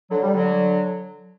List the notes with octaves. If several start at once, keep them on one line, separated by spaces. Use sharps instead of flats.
D3 F#3
G3
D3 F#3